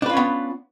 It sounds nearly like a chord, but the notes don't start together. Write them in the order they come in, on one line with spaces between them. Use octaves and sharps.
D4 B4 F4 C#4 B3